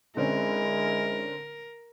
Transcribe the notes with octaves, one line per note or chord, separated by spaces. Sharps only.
D3 G#3 C4 C#4 E4 A#4